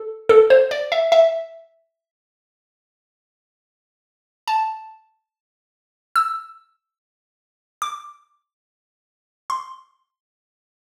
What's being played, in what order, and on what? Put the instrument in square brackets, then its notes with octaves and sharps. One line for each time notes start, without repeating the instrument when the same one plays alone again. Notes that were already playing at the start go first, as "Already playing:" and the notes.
Already playing: [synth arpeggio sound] A4
A4
C5
D5
E5
E5
A5
E6
D6
C6